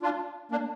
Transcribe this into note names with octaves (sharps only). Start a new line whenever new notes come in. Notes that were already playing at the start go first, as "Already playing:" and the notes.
D4 F4
A#3 D4